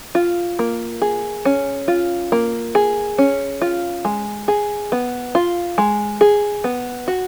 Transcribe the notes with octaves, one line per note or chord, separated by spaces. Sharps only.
F4
A#3
G#4
C#4
F4
A#3
G#4
C#4
F4
G#3
G#4
B3
F4
G#3
G#4
B3
F#4